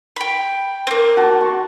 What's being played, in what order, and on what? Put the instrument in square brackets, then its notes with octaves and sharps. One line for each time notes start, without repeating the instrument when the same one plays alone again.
[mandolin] G5 B5
A#3 C4
[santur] F#4 A5
C#6